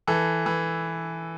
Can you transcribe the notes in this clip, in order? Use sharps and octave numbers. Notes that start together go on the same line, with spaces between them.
E3 A4
E3